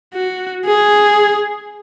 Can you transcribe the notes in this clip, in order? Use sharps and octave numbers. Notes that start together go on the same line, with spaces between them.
F#4
G#4